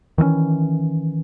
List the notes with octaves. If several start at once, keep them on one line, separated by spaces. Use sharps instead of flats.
D#3 E3 A#3 C#4